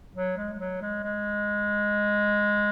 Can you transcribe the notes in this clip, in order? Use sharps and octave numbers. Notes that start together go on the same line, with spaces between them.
F#3
G#3
G#3
F#3
G#3
G#3